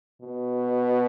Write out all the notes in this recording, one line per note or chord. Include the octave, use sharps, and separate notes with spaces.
B2